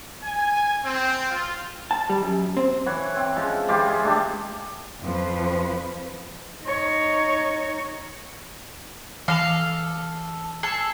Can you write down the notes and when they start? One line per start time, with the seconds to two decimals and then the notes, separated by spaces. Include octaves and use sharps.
0.22 G#5
0.84 C4
1.30 F4
1.91 A5
2.10 G3
2.23 F#2
2.57 C4
2.86 E3 C#5 F#5
3.16 C4
3.36 F3 G#3 C#4
3.69 E3 G#3 F4 G4
3.86 G#3 G#4
4.03 G#3 A3 D4 G4
5.02 F2 F3 B4
6.65 D#4 C#5
9.28 E3 A4 F5 F7
10.63 G#4 A4 E6 C7